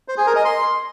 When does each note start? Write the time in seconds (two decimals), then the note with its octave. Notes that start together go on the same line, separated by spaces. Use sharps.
0.08 C5
0.17 G#4
0.27 A#4
0.36 D#5
0.45 C6